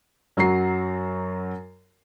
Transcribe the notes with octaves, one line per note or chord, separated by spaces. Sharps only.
F#2 F#3 F#4 A#5 C7